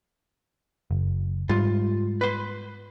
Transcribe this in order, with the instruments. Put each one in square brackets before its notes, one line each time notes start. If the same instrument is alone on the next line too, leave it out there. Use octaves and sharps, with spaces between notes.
[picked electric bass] F#1
[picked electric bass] G#2 G3 [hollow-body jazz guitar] F4
[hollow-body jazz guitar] B4 C6